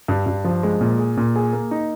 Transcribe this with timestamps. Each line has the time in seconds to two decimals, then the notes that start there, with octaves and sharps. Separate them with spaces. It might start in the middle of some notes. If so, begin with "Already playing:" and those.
0.08 G2
0.26 G2
0.44 F3
0.63 G#3
0.81 A#2
0.99 G#4
1.17 A#2
1.36 G#4
1.53 A#3
1.71 D#4